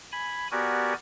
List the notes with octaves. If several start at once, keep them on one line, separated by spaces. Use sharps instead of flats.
G#5 B5
B3 F#4 G4 A#4 D5 G#5